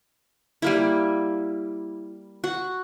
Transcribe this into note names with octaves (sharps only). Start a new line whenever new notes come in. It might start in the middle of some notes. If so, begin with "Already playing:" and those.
G3 A#3 E4
F#4